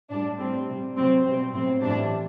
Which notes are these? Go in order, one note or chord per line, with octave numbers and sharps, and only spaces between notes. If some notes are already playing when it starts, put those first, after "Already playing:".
A2 G3 D4
A2 G3 C4
C3 G3
C3 F#3 C4
B2 G3 C4
A2 F#3 C4
A2 E3 G3 D4